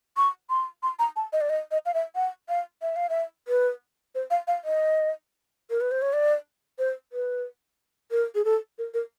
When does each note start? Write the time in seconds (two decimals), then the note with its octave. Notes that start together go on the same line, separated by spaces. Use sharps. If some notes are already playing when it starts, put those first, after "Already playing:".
0.17 C#6
0.50 C6
0.83 C6
0.99 A#5
1.16 A5
1.33 D#5
1.41 D5
1.50 D#5
1.71 D#5
1.86 F5
1.94 E5
2.15 F#5
2.49 F5
2.82 E5
2.96 F5
3.09 E5
3.48 B4
4.15 C5
4.31 F5
4.47 F5
4.65 D#5
5.70 A#4
5.81 B4
5.91 C5
6.02 C#5
6.13 D5
6.79 C5
7.13 B4
8.11 A#4
8.35 G#4
8.45 A4
8.78 A#4
8.94 A#4